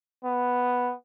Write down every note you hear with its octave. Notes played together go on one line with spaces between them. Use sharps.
B3